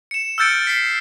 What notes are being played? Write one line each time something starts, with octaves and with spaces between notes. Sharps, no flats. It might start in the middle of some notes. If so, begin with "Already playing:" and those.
C#7 E7
E6 F6 G6 A6 C#7 D7
B6 C7